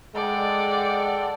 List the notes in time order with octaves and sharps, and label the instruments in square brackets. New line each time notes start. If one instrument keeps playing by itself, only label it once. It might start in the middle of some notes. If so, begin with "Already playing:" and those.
[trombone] G#3 [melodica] A4 G5 [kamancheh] D5 F#5